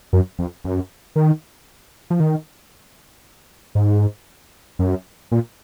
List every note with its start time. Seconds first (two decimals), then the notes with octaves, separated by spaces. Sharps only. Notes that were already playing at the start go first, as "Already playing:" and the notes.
0.13 F#2
0.39 F2
0.64 F#2
1.16 D#3
2.10 F3
2.20 D#3
3.75 G#2
4.79 F#2
5.32 A#2